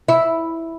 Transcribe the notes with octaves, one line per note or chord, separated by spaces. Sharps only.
E4